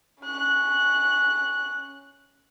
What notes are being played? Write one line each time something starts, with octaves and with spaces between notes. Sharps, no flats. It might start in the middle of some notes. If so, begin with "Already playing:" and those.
C#4 F#6